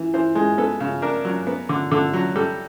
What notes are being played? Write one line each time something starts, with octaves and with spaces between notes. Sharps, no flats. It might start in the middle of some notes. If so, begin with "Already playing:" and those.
Already playing: E3
E3 C5
G#3
B3 A4
C#3
D4 A#4
F#3
B3
D3
D3 A4
F#3
G3 A4